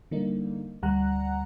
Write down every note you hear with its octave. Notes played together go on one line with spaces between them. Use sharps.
D3 G3 A#3 D#4
D2 G3 F#5 A#5 F#6